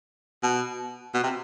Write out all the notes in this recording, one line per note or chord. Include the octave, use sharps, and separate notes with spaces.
B2
B2
C3